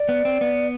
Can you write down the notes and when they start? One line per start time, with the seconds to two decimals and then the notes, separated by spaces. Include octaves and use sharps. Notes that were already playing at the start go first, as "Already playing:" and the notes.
Already playing: D5
0.09 B3
0.25 C4
0.41 B3